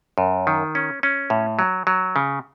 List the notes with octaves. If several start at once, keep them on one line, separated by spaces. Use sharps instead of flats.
F#2
D#3
C#4
C#4
A2
F#3
F#3
C#3